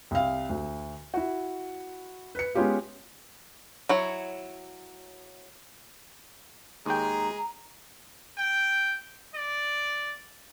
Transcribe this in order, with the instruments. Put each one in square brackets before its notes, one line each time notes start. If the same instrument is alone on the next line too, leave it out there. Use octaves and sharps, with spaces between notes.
[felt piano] C2 F5
D2
E4 F#4
B4 C#7
G#3 B3 C#4 F4 G4 F5
[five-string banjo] F#3 E4 C#5
[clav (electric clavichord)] D#2 G5 [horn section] G#3 G#4 [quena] A#5
[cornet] G5
D5